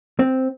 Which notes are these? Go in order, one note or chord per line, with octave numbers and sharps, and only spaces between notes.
C4